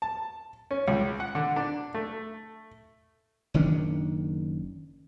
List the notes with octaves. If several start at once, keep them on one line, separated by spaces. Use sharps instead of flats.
A5
C#4
C#2
F#5
D3
D4
A3
F#1 D#3 C#4 D4